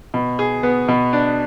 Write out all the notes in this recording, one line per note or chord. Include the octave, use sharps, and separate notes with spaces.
B2
G#4
B3
B2
D4